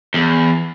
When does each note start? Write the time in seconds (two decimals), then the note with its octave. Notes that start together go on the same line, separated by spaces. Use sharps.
0.14 E2